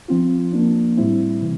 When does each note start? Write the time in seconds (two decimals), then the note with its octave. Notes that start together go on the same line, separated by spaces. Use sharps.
0.08 F3 C4 F4
0.52 F3 A#3 D4
0.97 A2 G3 C4 E4
1.41 C3 E3